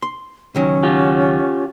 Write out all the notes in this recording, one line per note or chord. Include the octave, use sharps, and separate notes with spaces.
C6
C#2 D#3 F#3 C#4
F4 G4